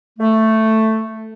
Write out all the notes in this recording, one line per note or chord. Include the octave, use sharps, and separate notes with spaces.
A3